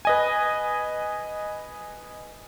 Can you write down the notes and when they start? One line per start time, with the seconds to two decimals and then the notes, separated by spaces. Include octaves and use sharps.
0.05 B4 D#5 G#5